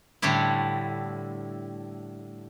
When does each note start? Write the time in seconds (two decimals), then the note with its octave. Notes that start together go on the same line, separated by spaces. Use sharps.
0.22 A2 D3 G3 A3 E4